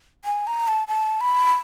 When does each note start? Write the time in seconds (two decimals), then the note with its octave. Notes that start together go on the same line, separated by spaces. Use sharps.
0.25 G#5
0.47 A#5
0.68 A5
0.88 A5
1.21 B5